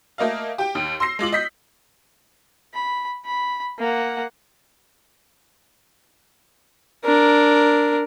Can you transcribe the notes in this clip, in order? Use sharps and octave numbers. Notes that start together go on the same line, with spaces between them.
A3 A#3 D#5 F5
G4 G5
D#2
C6 E6 A#6 C7
G#3 F4 D6 F#7
D#5 G6 B6
B5
B5
A#3 F#5
D4 A#4